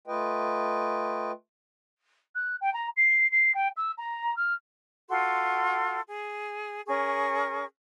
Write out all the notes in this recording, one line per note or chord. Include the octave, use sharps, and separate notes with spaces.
A3 F4 B4 D#5 G5
F#6
G5
A#5
C7
C7
G5
E6
A#5
F6
F4 F#4 A4 C6
G#4
C#4 G#4 A#4 C#6